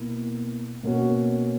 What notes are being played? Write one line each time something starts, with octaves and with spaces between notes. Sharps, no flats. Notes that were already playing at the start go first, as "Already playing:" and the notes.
Already playing: B2 A#3 E4
B2 A#3 C#4 F#4